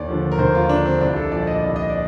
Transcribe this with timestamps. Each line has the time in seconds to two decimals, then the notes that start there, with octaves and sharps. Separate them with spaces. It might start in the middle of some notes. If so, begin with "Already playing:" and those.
Already playing: D#2 D5
0.08 D3 F3
0.32 A#4
0.38 D#2 C5
0.55 F4
0.69 D3 F3 D4
0.86 C4
1.01 C2 D4
1.16 A4
1.31 A#2 F3 D5
1.47 D#5
1.62 C2 D5
1.76 D#5
1.90 D5